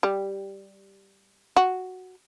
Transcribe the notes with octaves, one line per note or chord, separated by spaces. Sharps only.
G3
F#4